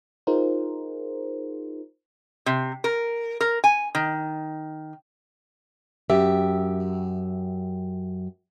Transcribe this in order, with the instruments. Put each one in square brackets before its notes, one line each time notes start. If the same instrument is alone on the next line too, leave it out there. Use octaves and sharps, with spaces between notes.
[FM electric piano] D#4 F4 G#4 A#4 C5
[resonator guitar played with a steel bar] C3
A#4
A#4
G#5
D#3
[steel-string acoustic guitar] F#2 G4 E5